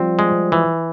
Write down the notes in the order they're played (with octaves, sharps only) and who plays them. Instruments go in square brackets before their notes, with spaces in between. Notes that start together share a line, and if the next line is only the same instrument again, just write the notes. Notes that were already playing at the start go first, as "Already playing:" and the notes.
Already playing: [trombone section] F3 G3 [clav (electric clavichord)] C4
[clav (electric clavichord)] G#3
E3